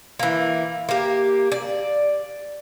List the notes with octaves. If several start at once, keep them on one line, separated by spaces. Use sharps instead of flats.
E3 A#3
A#3 G4
D5